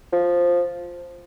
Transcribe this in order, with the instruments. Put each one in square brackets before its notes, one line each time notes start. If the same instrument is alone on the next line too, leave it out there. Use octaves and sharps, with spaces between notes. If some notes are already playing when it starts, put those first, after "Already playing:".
[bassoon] F3